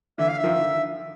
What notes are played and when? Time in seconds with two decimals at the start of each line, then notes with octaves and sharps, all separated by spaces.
0.18 D3 E3 E5
0.29 F5
0.38 E5
0.44 D#3 F3
0.58 D3